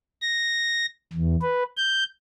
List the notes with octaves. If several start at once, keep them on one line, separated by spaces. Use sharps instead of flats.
A#6
E2
B4
G6